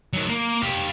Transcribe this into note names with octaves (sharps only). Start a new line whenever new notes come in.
D#3 F#3
A#3
G4 F5